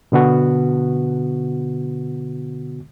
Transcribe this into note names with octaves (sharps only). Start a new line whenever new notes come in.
B2 D3 B3 F#4